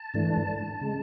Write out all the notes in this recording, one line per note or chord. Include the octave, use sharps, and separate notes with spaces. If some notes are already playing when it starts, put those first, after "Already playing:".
Already playing: A5
G#2 E3 A3 D4
C#3 G#3